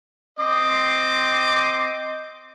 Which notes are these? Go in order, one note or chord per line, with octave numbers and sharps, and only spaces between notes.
C4 D#5 C6 D6